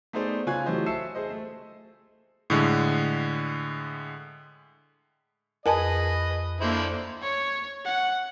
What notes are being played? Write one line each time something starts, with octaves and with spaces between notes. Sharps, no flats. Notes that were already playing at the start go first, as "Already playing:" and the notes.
A3 B3 D#4 G#4 C5 D5
C#3 F4 G#5 C#6 F#6 G#6
E3 F#3 A3 G4 C5 D#5
E5 A5 E6 C7 C#7 E7
G#4 C5 D#5
A3
A2 D3 G#3
F2 G#4 A#4 B4 D#5 G#5 A5
D3 A#3 E4 C5
C#5
F#5